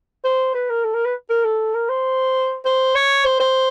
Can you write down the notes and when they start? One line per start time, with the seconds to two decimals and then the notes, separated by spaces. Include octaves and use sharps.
0.24 C5
0.54 B4
0.69 A#4
0.84 A4
0.94 A#4
1.05 B4
1.30 A#4
1.44 A4
1.75 A#4
1.89 C5
2.65 C5
2.95 C#5
3.25 C5
3.40 C5